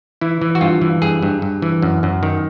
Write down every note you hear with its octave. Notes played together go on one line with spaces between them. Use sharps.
E3 E4
E3
F#4
G2 F4
E3
G2 G#4
G2
G2
E3
F#2
F#2
D#3